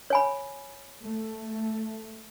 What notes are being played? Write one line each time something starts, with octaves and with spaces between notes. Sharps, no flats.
C#5 G#5 B5
A3